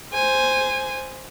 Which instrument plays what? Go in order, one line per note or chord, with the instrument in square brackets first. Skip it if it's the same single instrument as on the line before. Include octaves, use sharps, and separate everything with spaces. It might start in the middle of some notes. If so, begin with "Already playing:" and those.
[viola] C5 G#5